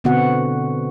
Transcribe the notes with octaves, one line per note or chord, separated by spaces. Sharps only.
B2 D3 B3 C4 F#4 F#5